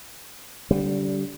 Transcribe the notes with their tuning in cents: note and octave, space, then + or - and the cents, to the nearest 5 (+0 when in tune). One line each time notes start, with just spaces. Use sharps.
D3 -35 G3 -20